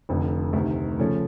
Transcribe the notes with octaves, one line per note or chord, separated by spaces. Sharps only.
F1 F2 D3
D2 C3 D#3
C#3 F3 A3 C#4